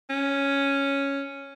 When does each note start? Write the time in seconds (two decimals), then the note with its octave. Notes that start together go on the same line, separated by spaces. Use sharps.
0.10 C#4